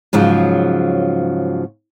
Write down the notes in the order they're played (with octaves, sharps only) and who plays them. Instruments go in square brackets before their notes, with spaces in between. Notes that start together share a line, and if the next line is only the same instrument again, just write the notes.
[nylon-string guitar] G#2 C#3 F3 F#3